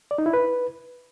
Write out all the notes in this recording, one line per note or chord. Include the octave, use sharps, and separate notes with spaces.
D5
D#4
E4
B4